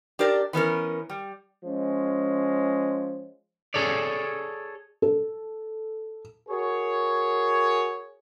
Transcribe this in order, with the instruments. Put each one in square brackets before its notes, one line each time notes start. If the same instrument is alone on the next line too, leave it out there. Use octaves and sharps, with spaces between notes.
[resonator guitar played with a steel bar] D4 G4 A#4 D5
E3 B3 C#4 A#4
G3
[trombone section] F3 G#3 C#4
[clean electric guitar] G#4 A4 C#5 D5
[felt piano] A4
[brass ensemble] F#4 G#4 A#4 C#5